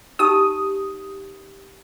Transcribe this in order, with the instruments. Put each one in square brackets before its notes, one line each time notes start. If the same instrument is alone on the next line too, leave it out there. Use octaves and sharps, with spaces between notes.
[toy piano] D#4 G4 G#5 [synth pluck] D#6